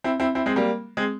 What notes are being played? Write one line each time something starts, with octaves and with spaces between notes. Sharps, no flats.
C4 E4
C4 E4
C4 E4
G#3 C4
G3 A#3
G#3 C4